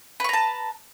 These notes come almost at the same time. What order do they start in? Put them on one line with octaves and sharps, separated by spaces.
B4 C#6 A#5 A5